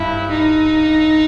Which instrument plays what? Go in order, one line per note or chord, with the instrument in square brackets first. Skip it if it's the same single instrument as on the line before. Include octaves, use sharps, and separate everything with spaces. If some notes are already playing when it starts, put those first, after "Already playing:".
Already playing: [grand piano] G2 [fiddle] E4
[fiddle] D#4